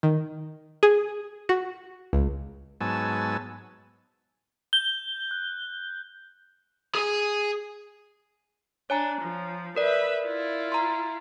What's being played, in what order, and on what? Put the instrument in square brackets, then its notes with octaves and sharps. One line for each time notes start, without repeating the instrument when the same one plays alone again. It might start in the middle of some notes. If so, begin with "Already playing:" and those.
[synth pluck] D#3
G#4
F#4
C#2
[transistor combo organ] G#2 F#3 B3 G#5 A5 E6
[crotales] G6 [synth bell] G7
[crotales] F#6
[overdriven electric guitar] G#4 G#5
[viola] D4 [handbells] C#5 G#5 A#5
[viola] F3
[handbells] A#4 D5 [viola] B4 E5
[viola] E4 F4
[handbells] A#5 C6